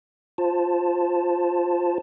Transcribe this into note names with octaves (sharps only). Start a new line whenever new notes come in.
F4 C5 A5